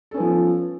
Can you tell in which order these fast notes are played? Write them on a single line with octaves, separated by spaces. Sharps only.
A4 C#4 B3 F3